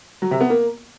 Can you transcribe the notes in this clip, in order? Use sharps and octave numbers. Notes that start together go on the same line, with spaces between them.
F#3
C3
B3
A#3